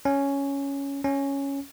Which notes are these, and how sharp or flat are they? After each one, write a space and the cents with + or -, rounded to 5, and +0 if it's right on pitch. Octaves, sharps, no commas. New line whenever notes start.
C#4 +5
C#4 +0